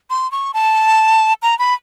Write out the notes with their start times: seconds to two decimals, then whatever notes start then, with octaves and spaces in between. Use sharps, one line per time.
0.10 C6
0.32 C#6
0.54 A5
1.42 A#5
1.59 B5